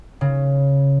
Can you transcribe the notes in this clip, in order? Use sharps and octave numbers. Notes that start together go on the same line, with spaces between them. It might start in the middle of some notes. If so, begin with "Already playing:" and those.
C#3